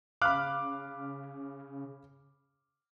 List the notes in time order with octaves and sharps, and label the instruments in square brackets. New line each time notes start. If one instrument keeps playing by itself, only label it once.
[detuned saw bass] C#3 [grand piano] F5 B5 [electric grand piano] D6 F6 F#6